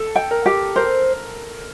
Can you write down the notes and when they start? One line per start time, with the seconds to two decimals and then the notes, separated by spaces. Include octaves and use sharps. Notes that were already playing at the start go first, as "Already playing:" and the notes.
Already playing: A4
0.15 G5
0.31 A#4
0.46 G4
0.76 A#4 C5